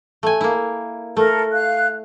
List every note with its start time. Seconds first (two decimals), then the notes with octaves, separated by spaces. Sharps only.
0.23 A3 G#5
0.41 A#3 E4
1.17 A3 A4 A#4
1.53 F5 F#6